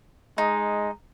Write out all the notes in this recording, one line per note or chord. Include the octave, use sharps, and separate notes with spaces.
G#3 D#4